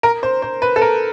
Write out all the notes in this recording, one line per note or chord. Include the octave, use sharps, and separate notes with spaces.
A#4
C5
C5
B4
A4
A#4